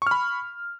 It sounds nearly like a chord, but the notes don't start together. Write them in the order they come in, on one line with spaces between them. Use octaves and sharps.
C#6 F6 B5